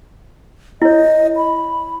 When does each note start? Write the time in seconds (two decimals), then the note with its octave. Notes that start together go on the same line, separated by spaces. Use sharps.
0.82 E4 C#5 D#5
1.37 B5